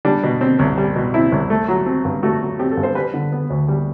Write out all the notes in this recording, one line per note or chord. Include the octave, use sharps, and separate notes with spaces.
G3 D4
B2
C4
C2
G3
B2
C4 E4
C2
A3
F#3
C4
G2
A3 F#4
F#3
C4 G4
A4
G2
C5
G3 B4
D3
B3
D2
G3